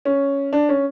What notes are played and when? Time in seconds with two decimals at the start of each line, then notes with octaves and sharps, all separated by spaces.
0.05 C#4
0.53 D4
0.69 C#4